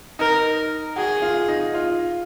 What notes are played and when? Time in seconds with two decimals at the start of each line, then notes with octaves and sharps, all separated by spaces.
0.19 D#4 A#4 D#5
0.96 F#4 G#4 F#5
1.22 F4 F5
1.48 D#4 D#5
1.74 F4 F5